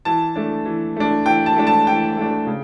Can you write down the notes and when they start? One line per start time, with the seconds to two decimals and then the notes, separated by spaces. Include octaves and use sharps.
0.05 E3 A5
0.36 A3 D4
0.65 E3
0.97 A3 D4
1.26 E3 G5
1.46 A5
1.57 A3 D4
1.67 A5
1.87 E3 G5
2.17 A3 D4
2.47 C#3